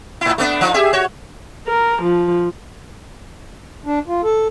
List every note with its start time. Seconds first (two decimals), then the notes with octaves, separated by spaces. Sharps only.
0.21 A2 E4
0.38 A3 B3 D4
0.61 F3 D#4
0.74 G4 G#4 E5
0.93 F#4 C#5
1.67 A#4
2.03 F3
3.86 D4
4.08 F4
4.23 A4